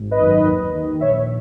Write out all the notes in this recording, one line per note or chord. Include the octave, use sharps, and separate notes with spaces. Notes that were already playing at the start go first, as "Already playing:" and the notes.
Already playing: G#1
B4 D#5
F#2 D#3
D#2
D#3
A#1 C#5 E5